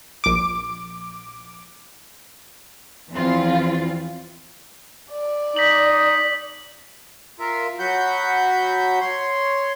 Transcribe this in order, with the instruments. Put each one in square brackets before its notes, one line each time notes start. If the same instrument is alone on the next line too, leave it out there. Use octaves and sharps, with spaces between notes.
[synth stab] A#1 D6
[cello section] E2 E3 F3 C4 F4
[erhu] D5
[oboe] D#4 [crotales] B6 F#7
[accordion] F4 A#4 E5
F#3 F#4 F#5 B5 G6
C#5 C6